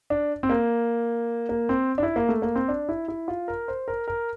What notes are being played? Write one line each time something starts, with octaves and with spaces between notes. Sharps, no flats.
D4
C4
A#3
A#3
C4
D4
E4
A#3
A3
A#3
C4
D4
E4
E4
F4
A#4
C5
A#4
A#4